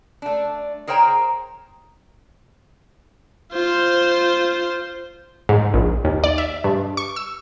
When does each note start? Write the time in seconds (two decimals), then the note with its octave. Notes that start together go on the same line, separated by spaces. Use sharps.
0.22 A3 D4
0.87 G#4 A#4 C5 C#5 G5 A#5
3.52 F4 C5
5.49 G#2
5.74 A#1
6.05 D#2
6.24 D5
6.38 E5
6.64 G2
6.97 C#6
7.16 E6